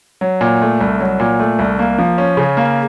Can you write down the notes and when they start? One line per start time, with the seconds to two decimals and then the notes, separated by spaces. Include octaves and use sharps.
0.21 F#3
0.41 A#2
0.62 A3
0.81 C2
1.00 F#3
1.20 A#2
1.39 A3
1.59 C2
1.79 A#3
1.98 F3
2.18 C#4
2.37 C#3
2.57 A#3